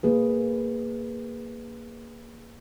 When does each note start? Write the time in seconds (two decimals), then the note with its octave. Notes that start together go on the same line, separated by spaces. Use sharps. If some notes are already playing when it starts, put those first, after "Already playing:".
0.03 A#3 G#4 B4